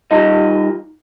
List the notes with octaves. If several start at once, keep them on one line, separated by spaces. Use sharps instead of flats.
G3 D#4 F4 D#5